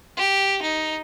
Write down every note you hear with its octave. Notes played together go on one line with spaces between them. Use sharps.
G4
D#4